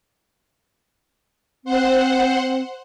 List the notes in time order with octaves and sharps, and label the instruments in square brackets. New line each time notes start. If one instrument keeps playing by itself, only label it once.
[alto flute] C4 [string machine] C5 F#5